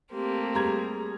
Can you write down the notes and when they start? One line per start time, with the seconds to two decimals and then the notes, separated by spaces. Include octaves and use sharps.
0.12 A3 A#3 C4 G4
0.54 G3 G#4 A#5 G#6